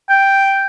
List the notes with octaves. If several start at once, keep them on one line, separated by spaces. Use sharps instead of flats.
G5